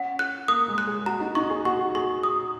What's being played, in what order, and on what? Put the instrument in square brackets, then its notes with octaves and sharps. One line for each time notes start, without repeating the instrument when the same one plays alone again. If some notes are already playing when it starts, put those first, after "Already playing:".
Already playing: [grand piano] C#4 [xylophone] F#5
[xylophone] F#6
[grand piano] A#3 [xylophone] D#6
[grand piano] G#3
[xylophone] F#6
[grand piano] G#4
[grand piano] F#4 [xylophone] A#5
[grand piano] D#4
[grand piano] D#4 [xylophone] C#6
[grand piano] G#4
[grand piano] F#4 [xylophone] C#6
[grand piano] G#4 [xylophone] C#6
[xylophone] D#6